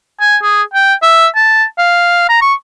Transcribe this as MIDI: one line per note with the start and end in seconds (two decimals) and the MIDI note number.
0.21 0.37 80
0.43 0.62 68
0.74 0.94 79
1.03 1.27 76
1.36 1.64 81
1.79 2.26 77
2.29 2.41 82
2.42 2.54 85